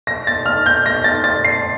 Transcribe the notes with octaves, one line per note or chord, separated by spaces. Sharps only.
A#6
A6
F6
G6
A#6
A6
A6
C7